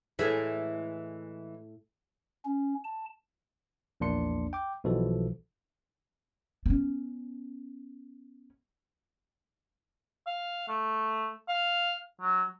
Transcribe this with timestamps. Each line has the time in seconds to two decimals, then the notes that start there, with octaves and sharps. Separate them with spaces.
0.19 A2 E3 G#3 E5
2.45 C#4
2.84 A5
4.00 A#1 E2 A#3 D4 C6 C#7
4.53 G5 D6
4.84 B1 B2 E3 F3 A4
6.66 B3 C#4
10.27 F5
10.69 A3
11.49 F5
12.21 F#3